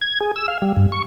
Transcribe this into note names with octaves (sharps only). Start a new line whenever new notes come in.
G#6
G#4
E6
F5
G3
G2
C#6